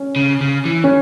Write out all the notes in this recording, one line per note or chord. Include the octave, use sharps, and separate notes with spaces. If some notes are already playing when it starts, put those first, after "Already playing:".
Already playing: C#4
C#3
C#3
E3
C#4